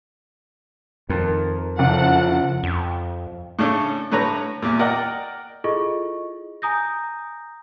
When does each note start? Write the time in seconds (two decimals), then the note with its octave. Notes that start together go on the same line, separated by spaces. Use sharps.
1.09 F2 D#3 A#4
1.79 F#1 F3 A4 F#5
2.63 F2
3.59 A2 C#3 C#4 D4 A4
4.12 A2 D3 B4 C#5 A#5
4.62 E2 A#2
4.79 A#4 D5 D#5 F#5 G5
5.64 E4 F4 G#4 A4 D#5 C#6
6.62 G#5 A#5 D#6 G6 A#6